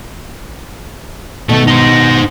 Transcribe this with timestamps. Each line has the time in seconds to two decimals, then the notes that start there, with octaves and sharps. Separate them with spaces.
1.49 B2 D#3 A3
1.67 D#4 C5